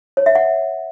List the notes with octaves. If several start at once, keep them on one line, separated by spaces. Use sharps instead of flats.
C#5
E5
F#5